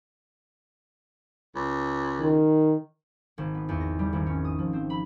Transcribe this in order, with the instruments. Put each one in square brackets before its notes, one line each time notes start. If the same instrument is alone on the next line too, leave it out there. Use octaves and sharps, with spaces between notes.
[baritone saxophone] C#2
[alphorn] D#3
[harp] G#1
B3
E2
A#6
G3
G#1
C#4
D#6
F3
C4
B5